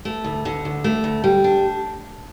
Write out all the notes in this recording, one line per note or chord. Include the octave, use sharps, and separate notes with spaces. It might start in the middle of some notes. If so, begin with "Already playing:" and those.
A3
D2
D3
D2
A3
D2
G3
D4